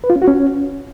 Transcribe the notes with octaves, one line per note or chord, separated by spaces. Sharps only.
B4
F4
C#4
F#4
C#4